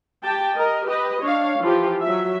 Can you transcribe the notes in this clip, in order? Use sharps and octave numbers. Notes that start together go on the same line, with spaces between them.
G4 G5 A5
A#4 D#5
G4 B4 D#5
D4 C#5 F5
E3 F3 F4 G4
F#3 E5